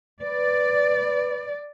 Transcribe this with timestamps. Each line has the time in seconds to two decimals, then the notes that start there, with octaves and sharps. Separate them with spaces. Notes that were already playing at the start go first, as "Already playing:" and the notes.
0.22 B4 D5